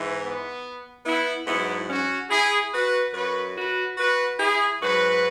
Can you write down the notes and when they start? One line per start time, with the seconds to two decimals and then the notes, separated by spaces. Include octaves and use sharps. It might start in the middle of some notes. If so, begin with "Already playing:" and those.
Already playing: G#2 E3
0.22 B3
1.05 B3 E4
1.47 G#2 F#3 B3 E4
1.88 C#4 F#4
2.30 E4 G#4
2.72 F#4 B4
3.13 F#2 F#3 F#4 B4
3.55 F#4 B4
3.97 F#4 B4
4.38 E4 G#4
4.80 G#2 F#3 F#4 B4